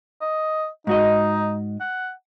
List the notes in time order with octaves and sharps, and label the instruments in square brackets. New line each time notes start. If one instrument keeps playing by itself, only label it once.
[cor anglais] D#5
[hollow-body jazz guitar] G#2 F#4 D#5 [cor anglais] D#4
[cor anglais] F#5